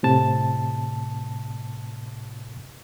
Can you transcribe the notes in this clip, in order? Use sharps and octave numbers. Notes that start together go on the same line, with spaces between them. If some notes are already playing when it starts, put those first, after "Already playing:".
A2 C3 A5